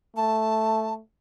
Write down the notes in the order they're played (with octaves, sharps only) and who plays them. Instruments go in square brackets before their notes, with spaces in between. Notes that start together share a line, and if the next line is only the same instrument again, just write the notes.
[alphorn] A3 [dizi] A5